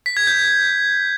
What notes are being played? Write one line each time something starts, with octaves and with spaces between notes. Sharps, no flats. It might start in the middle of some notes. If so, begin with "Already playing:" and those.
B6
G#6
G6